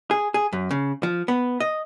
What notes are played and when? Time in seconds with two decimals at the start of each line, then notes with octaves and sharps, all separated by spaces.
0.11 G#4
0.34 G#4
0.53 F#2
0.71 C#3
1.03 F3
1.28 B3
1.60 D#5